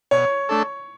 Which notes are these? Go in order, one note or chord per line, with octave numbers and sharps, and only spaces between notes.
B2 C#5
A3 D4 A4